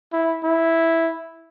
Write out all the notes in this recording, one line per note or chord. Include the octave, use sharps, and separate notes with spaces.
E4
E4